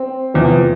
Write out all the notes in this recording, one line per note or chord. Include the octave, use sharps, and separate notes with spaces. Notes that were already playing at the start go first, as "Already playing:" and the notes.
Already playing: C4
E2 C3 F3